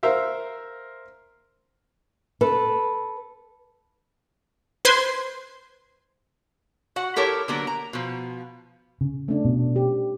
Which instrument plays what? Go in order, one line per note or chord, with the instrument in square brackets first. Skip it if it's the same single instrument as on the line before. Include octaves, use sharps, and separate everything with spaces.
[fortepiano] A#4 C5 E5 F5
[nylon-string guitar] A4 B4
[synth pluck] B4 C5 C6 G#6
[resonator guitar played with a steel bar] F#4 F#5
E4 G4 A4 A#4 C#5
D3 F#3 A#3 B3 A#4
A#5
B2 F3
[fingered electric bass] C#3
[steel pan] A3 C#4 D4
[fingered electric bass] B2
[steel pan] C#4 G4